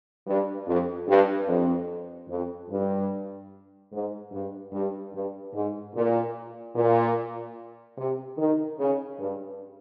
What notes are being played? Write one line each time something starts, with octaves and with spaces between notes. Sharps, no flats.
G2
F2
G2
F2
F2
G2
G#2
G2
G2
G2
G#2
A#2
A#2
C3
D#3
C#3
G2